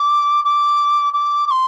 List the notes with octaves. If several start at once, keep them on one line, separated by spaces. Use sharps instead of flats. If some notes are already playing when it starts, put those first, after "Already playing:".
Already playing: D6
D6
D6
D6
C6